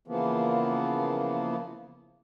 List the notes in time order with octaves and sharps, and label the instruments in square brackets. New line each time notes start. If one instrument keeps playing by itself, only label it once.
[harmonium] C#3 E3 F3 A#3 B3